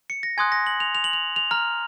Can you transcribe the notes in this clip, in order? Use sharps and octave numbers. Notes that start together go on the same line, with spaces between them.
C#7
A#6
G#5 C6 D#6 F#6 G#6
A#6
F#7
F7
F7
F#7
F7
F7
A#5 F6